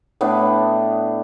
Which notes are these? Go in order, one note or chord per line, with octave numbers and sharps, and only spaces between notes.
A2 B3 D4